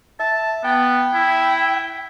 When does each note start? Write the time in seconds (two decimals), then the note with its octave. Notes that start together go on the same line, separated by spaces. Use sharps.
0.20 E5 A5
0.64 B3 G5
1.14 E4